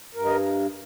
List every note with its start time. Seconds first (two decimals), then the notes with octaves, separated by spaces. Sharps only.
0.14 G2 A#4
0.25 D#5